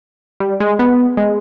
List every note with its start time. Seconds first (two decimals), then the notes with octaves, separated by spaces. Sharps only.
0.40 G3
0.60 G#3
0.79 B3
1.17 G#3